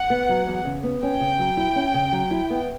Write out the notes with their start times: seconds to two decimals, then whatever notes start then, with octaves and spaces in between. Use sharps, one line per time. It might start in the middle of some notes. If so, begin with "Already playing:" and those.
Already playing: F#5
0.10 B3
0.29 F#3
0.47 E2
0.65 C#3
0.83 B3
1.03 C#4 G5
1.20 C#3
1.39 F#3
1.57 E4
1.76 C#4
1.94 C#3
2.12 F#3
2.31 E4
2.50 B3